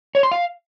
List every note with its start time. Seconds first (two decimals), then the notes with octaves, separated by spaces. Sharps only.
0.15 C#5
0.23 C6
0.32 F5